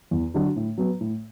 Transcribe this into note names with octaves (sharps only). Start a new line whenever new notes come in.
E2
D3 F#3 D4 F#4
A2
F#3 B3
A2